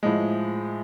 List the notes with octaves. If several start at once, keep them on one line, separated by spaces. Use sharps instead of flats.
A2 F3 G#3